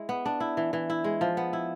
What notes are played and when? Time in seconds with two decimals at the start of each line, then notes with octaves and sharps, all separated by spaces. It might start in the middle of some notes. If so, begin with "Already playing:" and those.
Already playing: G#3 E4
0.09 B3
0.26 D4
0.40 E4
0.57 E3
0.73 E3
0.90 E4
1.04 G#3
1.21 F3
1.37 B3
1.53 E4